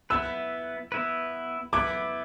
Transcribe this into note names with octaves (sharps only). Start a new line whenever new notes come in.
B3 E4 B4 E6
B3 E4 B4
B3 E4 B4 D6